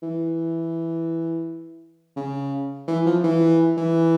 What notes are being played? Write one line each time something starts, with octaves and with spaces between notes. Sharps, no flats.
E3
C#3
E3
F3
E3
E3